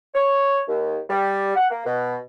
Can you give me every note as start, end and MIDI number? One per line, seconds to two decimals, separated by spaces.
0.15 0.61 73
0.67 0.97 39
1.09 1.52 55
1.56 1.69 78
1.71 1.84 58
1.86 2.17 47